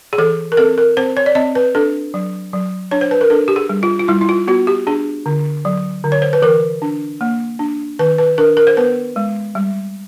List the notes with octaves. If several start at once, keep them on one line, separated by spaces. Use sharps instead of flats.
G#4
E3 A4
A#4
C4 A4
A#4
C4 C5
C#5
D5
C4 D#5
B4
D4 A4
F#3
F#3
D4 C#5
C5
B4
A#4
D4 A4
G4
G#4
G3
F4
F4
G3 E4
E4
F4
B3 F#4
G4
D4 G#4
D3
F#3
D3
C#5
C5
B4
E3 A#4
D4
A#3
D4
D#3 B4
B4
D4 A#4
A#4
C5
B3 B4
G#3
G3